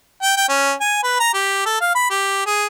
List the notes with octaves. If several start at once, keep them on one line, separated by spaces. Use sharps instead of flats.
G5
G5
C#4
G#5
B4
A#5
G4
A4
F5
B5
G4
G#4